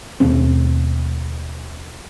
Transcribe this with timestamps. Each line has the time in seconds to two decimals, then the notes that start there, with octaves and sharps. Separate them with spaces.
0.20 D#2 B2 A3 C4